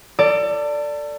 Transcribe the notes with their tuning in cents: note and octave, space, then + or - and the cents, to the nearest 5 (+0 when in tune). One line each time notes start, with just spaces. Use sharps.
A4 +30 D5 +0